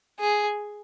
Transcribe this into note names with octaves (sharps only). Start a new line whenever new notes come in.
G#4